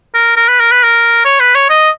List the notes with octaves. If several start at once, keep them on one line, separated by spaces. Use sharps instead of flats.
A#4
A#4
B4
A#4
B4
A#4
C#5
B4
C#5
D#5